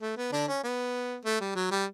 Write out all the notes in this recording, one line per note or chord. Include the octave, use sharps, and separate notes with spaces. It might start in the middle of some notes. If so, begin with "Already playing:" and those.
A3
B3
D3 D4
C#4
B3
A3
G3
F#3
G3